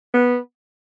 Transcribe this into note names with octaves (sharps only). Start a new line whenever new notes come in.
B3